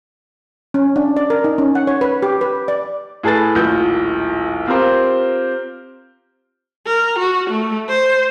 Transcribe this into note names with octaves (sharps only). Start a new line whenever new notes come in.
C#4
D4
D5
A#4
D#4
C#4
F#5
C#5
B4
G4
B4
D5
A2 G#4 A4 B4 A6
D#1 A#1 A2 F#4 G6
C4 F4 G4 A#4 C5
A#4
F#4
A3
C5